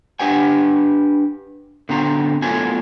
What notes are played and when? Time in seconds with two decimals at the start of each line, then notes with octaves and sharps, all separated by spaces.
0.19 D4 G4 B4 F#5 G#5
1.89 D3 B3 C4 F#4 A#5
2.42 A2 F#3 B3 F4 A4 G#5